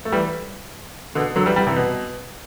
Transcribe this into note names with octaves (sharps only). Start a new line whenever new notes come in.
A3
E3 G3
B2 D3
D3 F#3
E3 G3
E3 G3
C3 E3
B2